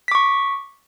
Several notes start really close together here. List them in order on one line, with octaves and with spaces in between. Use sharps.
B6 D6 C#6